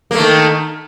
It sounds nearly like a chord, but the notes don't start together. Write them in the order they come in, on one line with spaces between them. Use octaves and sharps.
A#3 A3 D#3